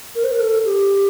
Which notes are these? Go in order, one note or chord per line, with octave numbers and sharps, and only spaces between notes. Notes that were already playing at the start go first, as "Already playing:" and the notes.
A#4
C5
A#4
A4
G4